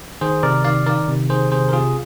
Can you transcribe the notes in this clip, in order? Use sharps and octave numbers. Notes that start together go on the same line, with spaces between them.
D#3 G#4 C5
C3 A#4 D5
D#3 D5 F5
D#3 A#4 D5
C3
D#3 G#4 C5
C3 G#4 C5
A#4
C3 F4 G#4